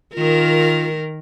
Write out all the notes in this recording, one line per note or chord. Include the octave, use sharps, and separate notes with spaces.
D#3 F4 A#4